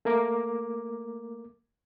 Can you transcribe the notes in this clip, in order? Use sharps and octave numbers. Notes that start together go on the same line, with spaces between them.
A3 A#3 A#4 D6